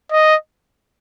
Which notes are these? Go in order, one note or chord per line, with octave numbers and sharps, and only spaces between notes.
D#5